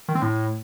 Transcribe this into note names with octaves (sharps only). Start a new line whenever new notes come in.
D#3
C4
A2